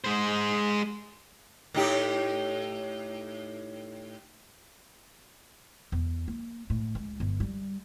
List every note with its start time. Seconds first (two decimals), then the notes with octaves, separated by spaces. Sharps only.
0.04 G#3 C5
1.74 A2 D#4 G4
5.92 E2
6.28 A#3
6.70 A2
6.95 C#2
7.20 G1
7.40 G3